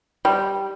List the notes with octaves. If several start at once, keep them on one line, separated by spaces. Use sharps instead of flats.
G3